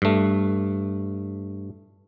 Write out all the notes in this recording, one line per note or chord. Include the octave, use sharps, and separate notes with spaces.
G2 A3